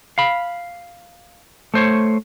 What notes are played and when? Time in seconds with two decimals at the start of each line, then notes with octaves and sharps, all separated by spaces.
0.18 F5 B5
1.74 A3 C5 C#5